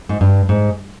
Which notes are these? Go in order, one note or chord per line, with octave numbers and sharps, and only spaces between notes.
G#2
G2
G#2